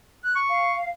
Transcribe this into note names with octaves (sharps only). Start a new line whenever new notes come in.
F#6
C#6
F5